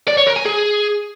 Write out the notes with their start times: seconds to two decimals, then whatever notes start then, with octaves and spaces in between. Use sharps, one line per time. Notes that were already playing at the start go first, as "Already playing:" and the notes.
0.08 D5
0.17 C#5
0.27 A#4
0.36 G#5
0.46 G#4